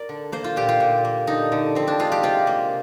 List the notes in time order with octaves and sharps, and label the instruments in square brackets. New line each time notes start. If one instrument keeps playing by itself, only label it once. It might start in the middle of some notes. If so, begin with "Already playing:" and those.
Already playing: [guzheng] A#4 D5
D3
A#3 C5
F4
A#2 G4
F4
A#2
A#3
D3 D#4
D3
F3 C4
D4
G#3 F4
G4
C3 F4
A#3